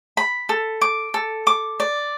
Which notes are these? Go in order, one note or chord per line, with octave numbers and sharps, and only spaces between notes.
B5
A4
D6
A4
D6
D5